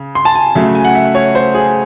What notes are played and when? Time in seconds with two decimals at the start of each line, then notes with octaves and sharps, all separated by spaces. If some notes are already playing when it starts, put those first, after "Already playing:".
Already playing: C#3
0.15 C6
0.25 A5
0.35 G#5
0.55 C#3 F#3 A3 E5
0.75 G#5
0.85 F#5
0.95 E5
1.15 C#5
1.35 C5
1.54 G#4